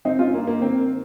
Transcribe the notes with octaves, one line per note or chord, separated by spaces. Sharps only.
G#1 C4 D#4
C#4 F4
G2 A#3
A#3
D#3 C4